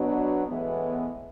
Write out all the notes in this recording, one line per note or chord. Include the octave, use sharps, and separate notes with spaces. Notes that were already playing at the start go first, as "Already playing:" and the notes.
Already playing: B2 F#3 B3 D4
A2 E3 G#3 B3